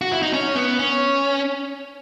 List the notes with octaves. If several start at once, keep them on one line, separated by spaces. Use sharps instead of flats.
F#4
E4
D#4
C#4
B3
C#4